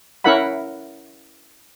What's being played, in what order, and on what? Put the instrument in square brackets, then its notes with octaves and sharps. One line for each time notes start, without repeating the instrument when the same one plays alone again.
[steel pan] C#4 E4 A#4 E5 F#5 B5